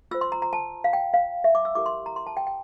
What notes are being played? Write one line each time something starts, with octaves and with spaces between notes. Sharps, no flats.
F4 C5 E6
C6
A#5
A#5
A5
F5
G5
F5
E5
D6
E6
E4 G4 A#4 D6
C6
A#5
C6
A5
G5
G5